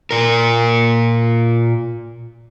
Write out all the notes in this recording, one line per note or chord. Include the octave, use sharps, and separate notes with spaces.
A#2 A#4